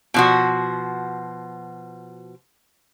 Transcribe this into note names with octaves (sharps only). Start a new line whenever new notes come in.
B2 F3 F#4